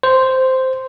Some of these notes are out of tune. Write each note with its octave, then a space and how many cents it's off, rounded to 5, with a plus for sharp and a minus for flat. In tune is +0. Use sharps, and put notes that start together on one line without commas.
C5 -5